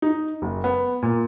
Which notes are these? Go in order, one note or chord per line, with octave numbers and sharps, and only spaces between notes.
D#4
F#1
B3
A#2